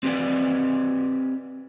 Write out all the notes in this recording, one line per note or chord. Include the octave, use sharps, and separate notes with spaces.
C4 G4 B4 D5